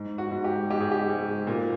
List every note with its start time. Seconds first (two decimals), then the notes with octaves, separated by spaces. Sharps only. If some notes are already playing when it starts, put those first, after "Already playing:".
Already playing: G#2
0.18 F#4
0.31 G#2
0.44 G4
0.70 G#2 G4
0.81 G#4
0.92 G4
1.09 G#2
1.47 A#2